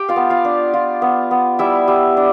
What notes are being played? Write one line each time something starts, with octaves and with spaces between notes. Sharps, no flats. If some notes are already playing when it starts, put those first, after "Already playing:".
Already playing: G4 G5
F4 F5
B3
F4 F5
D4
F4
B3
B3
G3 E4 E5
G3
D4